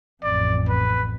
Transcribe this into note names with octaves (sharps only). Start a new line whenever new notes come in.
A1 F2 D5
B4